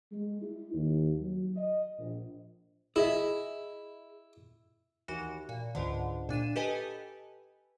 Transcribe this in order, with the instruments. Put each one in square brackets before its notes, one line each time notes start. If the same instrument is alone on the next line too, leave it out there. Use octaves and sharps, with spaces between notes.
[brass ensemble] G#3
E4
D#2
F#3
D#5
A#1
[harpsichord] E4 [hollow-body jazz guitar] G#4 D#5 E5
[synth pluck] D#2 E3 F#4
A#2
C#2 G#2 D3
A#2 D4 D#7 E7
G4 A4 B4 D#5 G#5